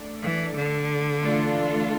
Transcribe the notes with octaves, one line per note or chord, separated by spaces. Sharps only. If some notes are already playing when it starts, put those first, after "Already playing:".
Already playing: A3 D4 A4 D5
E3
D3
E3 A3 D4 F4 A4